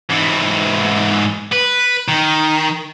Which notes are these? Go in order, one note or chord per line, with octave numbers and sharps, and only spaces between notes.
G#2 E3
B4
D#3